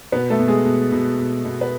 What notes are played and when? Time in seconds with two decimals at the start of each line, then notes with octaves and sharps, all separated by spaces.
0.12 B2 B3 B4
0.30 A3 A4
0.39 B2
0.48 G#3 G#4
0.65 B2
0.92 B2
1.18 B2
1.45 B2
1.61 B4